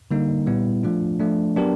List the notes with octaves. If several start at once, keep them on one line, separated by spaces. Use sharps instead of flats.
D3 G3 A#3 D#4
A#2 G3 B3 E4
F3 A3 D4 F4
F3 A3 D4
F#3 B3 D4 G4 A#4